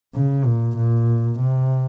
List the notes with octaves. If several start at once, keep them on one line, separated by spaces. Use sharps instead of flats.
C#3
A#2
A#2
C3